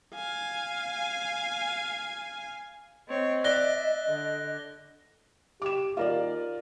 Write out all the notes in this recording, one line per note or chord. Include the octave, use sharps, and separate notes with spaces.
F5 G#5
C4 C#5 D#5
D5 E5 F#6 A#6 G7
D3
G4 D6 E7
D#2 F4 A#4 D5